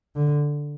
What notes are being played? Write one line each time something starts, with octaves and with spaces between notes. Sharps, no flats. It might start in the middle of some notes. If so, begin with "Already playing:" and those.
D3